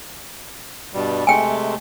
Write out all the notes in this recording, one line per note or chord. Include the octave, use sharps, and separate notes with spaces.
G2 B2 G3
C3 G#3 A3 G5 G#5